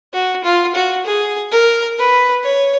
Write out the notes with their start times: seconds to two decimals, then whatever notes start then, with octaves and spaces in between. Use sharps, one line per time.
0.13 F#4
0.44 F4
0.75 F#4
1.06 G#4
1.52 A#4
1.98 B4
2.44 C#5